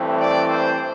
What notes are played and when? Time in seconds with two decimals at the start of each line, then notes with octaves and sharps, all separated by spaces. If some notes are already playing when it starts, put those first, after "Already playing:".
Already playing: G2 E3 A3 C4
0.18 D5
0.48 C5